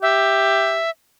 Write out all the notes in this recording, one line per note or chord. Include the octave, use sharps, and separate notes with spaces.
G4 E5